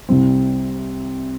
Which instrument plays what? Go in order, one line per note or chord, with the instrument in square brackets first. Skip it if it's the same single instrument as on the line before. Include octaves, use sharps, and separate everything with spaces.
[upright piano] C2 C3 G3 C4